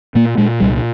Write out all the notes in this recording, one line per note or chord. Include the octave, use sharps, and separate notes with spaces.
A#2 A#3
A#2 G#3
C2 G3